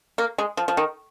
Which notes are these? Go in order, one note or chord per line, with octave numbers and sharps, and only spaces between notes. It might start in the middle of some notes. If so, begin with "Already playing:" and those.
A#3
G#3
F3
F3
D#3